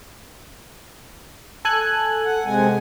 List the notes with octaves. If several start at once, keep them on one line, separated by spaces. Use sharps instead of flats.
A4 G#5 F#6
F#5
C3 G#3 G#5